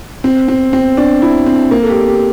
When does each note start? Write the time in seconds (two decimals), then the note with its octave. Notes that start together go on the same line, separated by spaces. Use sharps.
0.24 C4
0.48 C4
0.73 C4
0.97 D4
1.22 E4
1.46 C4
1.71 A#3
1.83 A4
1.90 G4
2.08 G4